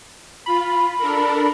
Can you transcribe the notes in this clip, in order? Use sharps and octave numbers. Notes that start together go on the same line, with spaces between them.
F4 B5
D4 A4 A#4